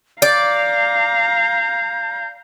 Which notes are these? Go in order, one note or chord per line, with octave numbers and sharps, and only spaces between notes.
D5 F5 A#5 G6